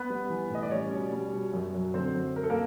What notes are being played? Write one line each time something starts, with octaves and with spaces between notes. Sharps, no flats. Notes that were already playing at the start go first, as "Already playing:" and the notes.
Already playing: B3 B4
G3
E3
A2 D#5
D5
G3 C#4 C#5
B2
G3
B2
F#2
F#3
D3 C4 C5
F#2
F#3 A#4
A4
A#3 A#4